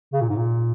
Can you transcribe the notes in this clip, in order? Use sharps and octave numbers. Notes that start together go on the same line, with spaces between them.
C#3
A#2
G#2
A#2